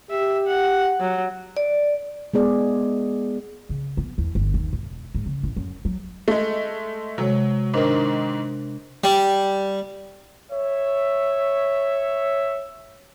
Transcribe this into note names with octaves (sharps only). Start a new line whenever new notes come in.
G4 E5
F#5
F#3
D5
G#3 B3 G#4 D5
C#3
B3
E2
G1
D#2
E1
G#2
C#3
A1
F#2
F#3
G#3 A3
C3 F#3 G#3 C#5
G#2 D#3 D4 A#4 C5
G3
C#5 E5